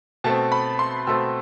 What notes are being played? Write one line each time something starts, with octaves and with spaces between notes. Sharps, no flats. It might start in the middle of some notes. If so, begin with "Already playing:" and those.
B2 A3 C4 A5
B5
C6
B2 A3 C4 E6